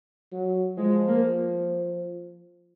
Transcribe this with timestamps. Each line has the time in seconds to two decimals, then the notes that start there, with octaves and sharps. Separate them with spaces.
0.32 F#3
0.77 F3 G#3
1.08 A#3